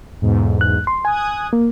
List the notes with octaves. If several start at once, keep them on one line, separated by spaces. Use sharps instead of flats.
B1 E2 G#2
F#6
C6
G#5 D#6 F#6 G#6
A#3